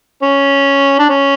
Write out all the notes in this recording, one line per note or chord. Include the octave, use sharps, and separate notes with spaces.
C#4
D4
C#4